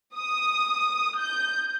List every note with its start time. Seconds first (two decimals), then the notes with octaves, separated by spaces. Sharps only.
0.17 D#6
1.20 G6